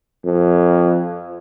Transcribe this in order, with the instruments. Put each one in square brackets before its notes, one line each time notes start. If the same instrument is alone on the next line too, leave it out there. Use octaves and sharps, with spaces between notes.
[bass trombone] F2